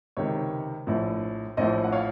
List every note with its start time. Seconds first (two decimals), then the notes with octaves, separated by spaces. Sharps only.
0.17 C#2 C3 D#3 C#5
0.87 A#1 A2 F3
1.57 A#1 A2 F3 C5 D#5
1.84 F#5
1.92 C#5 F5